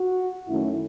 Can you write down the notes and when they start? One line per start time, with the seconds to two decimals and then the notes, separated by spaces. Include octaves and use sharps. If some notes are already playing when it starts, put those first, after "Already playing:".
Already playing: F#4
0.47 F#2 D#3 A3 C#4 E4